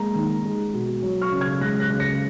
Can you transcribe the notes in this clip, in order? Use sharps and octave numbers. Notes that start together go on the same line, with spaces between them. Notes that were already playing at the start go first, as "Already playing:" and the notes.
Already playing: G#3 A#3 A#5
D#3
G#3
B2
F#3
C#6 F6
C#3
F6 G#6
G#3 F#6 A#6
F#6 A#6
C#3
A#6 C#7